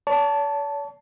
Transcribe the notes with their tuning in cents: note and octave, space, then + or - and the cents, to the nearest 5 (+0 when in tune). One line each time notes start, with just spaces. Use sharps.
C#5 +45 A5 +0